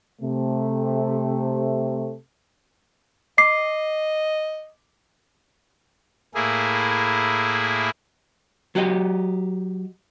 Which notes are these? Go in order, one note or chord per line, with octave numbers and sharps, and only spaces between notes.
C3 A3
D#5 D6 C7
A2 A#3 E4 G#4
F#3 F#4 G4 D#5